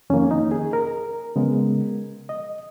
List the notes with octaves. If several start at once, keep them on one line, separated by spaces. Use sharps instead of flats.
F2 D#3 A#3 C#4
D#4
G#4
A#4
C#3 G#3 B3
D#5